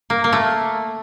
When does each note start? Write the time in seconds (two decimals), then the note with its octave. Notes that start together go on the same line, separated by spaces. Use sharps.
0.10 A#3
0.24 A#3
0.33 A3